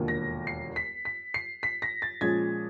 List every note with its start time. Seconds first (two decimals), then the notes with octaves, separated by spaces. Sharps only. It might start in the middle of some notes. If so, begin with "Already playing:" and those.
Already playing: E1 D#2 D3 F3 A#3
0.08 A#6
0.47 C7
0.76 B6
1.05 B6
1.34 C7
1.63 B6
1.82 A#6
2.02 A6
2.21 A#2 F3 G#3 C#4 G#6